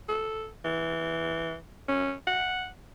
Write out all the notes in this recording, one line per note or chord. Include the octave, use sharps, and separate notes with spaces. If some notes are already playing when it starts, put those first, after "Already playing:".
A4
E3
C#4
F#5